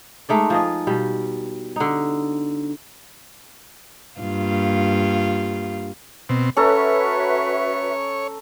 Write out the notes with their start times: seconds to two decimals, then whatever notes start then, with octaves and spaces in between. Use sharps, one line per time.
0.29 G#3 A3 D#4 D5
0.50 F3 G#4 D#5
0.87 B2 G3
1.76 D3 D#4
4.19 G2 A#3 F4
6.29 B2 C4
6.57 C#4 F#4 A4 B4 C#5 E5 A#5